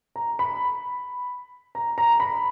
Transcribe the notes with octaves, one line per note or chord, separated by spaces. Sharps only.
A#5
B5
A#5
A#5
B5